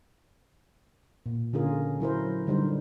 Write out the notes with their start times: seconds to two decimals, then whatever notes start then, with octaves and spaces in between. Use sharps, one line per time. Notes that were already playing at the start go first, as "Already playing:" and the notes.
1.26 A#2
1.53 D3 C#4 F4 G#4 A#4
2.00 F#3 E4 A#4 C5
2.47 D3 G3 D#4 C5